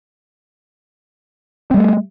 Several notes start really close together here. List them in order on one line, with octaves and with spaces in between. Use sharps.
C4 G3 A3